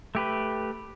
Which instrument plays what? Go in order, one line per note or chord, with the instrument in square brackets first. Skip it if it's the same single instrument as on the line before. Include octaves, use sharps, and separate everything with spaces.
[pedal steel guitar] A3 G4 B4